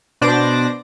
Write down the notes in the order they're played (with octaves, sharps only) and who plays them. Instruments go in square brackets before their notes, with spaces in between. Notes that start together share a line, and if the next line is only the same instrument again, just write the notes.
[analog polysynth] B2 D4 C5 D5 D6 A#6